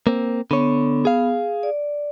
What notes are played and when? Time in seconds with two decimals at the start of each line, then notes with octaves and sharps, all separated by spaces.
0.07 A#3 C4
0.51 D3 B3 C#5
1.05 G#4 F5
1.63 D5